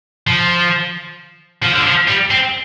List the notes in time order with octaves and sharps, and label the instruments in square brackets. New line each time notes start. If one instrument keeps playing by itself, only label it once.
[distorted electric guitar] F3
F3
D3
F3
G3
C4